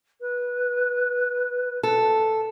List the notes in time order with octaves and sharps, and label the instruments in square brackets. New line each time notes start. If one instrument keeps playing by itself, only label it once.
[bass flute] B4
[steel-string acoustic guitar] A4